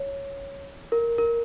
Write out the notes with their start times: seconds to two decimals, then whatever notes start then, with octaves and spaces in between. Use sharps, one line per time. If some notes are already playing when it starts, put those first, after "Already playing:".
Already playing: C#5
0.92 A#4
1.18 A#4